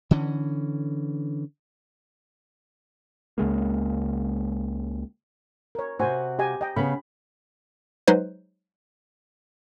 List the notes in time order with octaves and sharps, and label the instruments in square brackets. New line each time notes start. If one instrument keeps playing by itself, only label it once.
[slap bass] D3 E3 C#4
[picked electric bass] C#2 C#3 G#3 A#3
[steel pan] A#4 C#5
[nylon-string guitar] C3 F#4 [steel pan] C5 G#5
[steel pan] G4 D#5 G#5
D#5 G5
[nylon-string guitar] C#3 B3 [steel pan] B5
[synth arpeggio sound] F#3 G#3 D#4 B4 C5